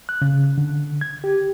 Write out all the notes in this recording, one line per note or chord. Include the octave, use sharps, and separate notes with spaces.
F#6
C#3
D3
G#6
G4